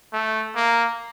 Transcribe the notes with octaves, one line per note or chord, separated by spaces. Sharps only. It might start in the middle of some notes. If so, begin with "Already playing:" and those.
A3
A#3